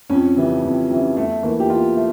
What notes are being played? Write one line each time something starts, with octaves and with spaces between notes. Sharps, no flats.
F2 C#4
C#3 E3 G3
F2
C#3 E3 G3
E2 A3
E3 A3 A#3
G4
E2 F4
A3